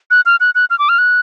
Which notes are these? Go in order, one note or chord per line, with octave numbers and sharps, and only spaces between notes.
F#6
F6
F#6
F#6
F6
D6
F6
F#6